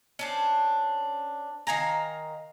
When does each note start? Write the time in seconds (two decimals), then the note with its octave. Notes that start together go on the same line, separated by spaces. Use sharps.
0.19 C#4 D4 C5
1.67 D#3 F5 G#5 A#5